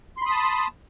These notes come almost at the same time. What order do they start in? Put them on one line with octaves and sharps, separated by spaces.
C6 B5 D#6 A5